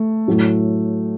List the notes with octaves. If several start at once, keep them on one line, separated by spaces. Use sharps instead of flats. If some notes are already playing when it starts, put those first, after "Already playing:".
Already playing: A3
A2 F#3 A3